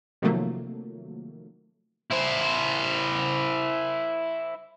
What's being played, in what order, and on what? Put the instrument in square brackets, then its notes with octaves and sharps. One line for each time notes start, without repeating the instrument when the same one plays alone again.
[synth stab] C3 D#3 F3 F#3 A3 A#3
[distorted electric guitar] E4 C5